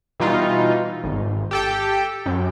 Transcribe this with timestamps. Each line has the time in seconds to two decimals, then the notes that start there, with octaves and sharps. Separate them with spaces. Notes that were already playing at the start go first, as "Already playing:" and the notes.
0.20 B2 E3 G3 D#4 F4
1.03 G#1
1.51 G4 A4 G5
2.26 F#2